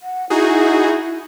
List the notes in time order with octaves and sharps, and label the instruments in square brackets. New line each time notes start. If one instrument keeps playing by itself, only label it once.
[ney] F#5
[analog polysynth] D#4 F#4 G#4 [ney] E4